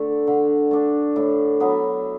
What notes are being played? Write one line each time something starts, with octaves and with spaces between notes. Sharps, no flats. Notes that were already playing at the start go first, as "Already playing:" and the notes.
Already playing: D3 A3 D4
D3
A3 D4
A2
F#3 B3 E4